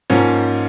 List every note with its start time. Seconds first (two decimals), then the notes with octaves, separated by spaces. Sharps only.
0.10 G#2 F3 A#3 C#4